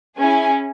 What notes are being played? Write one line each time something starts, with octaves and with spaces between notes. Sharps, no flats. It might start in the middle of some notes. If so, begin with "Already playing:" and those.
C#4 E4 G#4 G#5